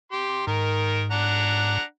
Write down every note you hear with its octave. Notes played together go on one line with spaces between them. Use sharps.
G4 C6
G#2 D#3 A#4
D4 F#5 A#5